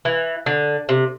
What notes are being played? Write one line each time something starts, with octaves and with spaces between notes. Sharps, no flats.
E3
D3
C3